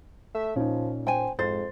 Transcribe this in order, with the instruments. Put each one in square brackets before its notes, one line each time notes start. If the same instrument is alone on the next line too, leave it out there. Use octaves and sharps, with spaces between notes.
[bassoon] A3 [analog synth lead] E5
[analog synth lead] A#2 [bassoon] F3 [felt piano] C#4 D#4
[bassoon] C5 [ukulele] G5 G#5
[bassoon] F2 [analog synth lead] G#2 [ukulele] C5 [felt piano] A6